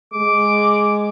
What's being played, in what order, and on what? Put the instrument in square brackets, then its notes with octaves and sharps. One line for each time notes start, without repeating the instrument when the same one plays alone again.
[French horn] G#3 [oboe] D6